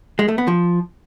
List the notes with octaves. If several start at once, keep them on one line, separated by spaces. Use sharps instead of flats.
G#3
A3
B3
F3